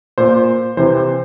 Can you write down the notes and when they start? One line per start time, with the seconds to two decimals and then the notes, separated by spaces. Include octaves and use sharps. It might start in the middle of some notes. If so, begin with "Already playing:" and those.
0.18 A#2 C5
0.77 C3 E3 C5